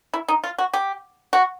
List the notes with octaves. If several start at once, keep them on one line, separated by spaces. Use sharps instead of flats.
E4
D#4
F4
F#4
G4
F#4